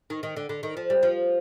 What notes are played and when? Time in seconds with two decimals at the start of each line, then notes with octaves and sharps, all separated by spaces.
0.10 D#3
0.23 D#3
0.36 D3
0.49 D3
0.63 D#3
0.77 F3
0.90 G3
1.03 F3